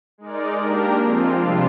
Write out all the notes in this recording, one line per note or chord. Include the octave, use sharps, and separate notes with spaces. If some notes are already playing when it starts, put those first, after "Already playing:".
G#3 D#4 A#4 D5
A#3 D4 G4 A#4
F3 G#3 C4 F4
C3 G3 D4 F4